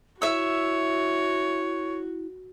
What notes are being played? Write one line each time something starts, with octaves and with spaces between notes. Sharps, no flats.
E4 F#4 C#5 E5 E6